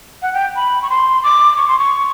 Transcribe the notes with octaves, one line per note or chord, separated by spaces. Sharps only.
F#5
G5
B5
C#6
C6
D6
C#6
C6
C#6